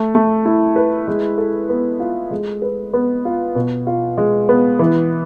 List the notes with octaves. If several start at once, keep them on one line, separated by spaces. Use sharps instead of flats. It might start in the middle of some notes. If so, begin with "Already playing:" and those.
Already playing: A3
A3
E4
B4
G#3
A4
B3
F4
G#3
B4
B3
F4
B2
F4
G#3
B3
E3